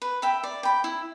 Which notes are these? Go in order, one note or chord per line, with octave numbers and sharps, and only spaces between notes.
B4
E5 G5 B5
D5
G5 B5
E4